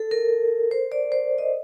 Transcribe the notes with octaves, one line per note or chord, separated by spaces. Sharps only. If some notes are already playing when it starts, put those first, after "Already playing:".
Already playing: A4
A#4
C5
D5
C5
D#5